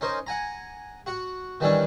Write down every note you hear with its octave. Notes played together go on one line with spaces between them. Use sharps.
C#4 D#4 A#4 C5
F#5 G#5 A#5
F#4 F#5
D#3 E3 G3 C#4 D4